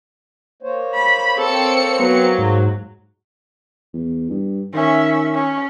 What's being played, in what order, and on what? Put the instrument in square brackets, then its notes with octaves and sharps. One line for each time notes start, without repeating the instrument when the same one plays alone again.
[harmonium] A#3 C5 C#5
[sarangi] B5
[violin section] C4 C#7 [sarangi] A4
[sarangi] F#3 [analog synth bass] B3
[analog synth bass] G#2
[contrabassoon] E2
G2
[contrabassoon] D#3 [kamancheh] C#4 E5
[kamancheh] C#4